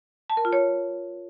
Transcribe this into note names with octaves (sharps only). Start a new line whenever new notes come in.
A5
A#4
F4
C#5